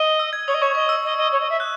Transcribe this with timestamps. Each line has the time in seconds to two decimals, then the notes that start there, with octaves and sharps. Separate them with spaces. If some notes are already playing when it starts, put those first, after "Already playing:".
Already playing: D#5
0.19 E6
0.33 G#6
0.47 C#5 D#6
0.54 D#5
0.62 C#5 C#6
0.75 D#5 C#6
0.89 E6
1.04 D#5
1.17 D#5
1.32 C#5
1.40 D#5
1.50 E5
1.60 F#6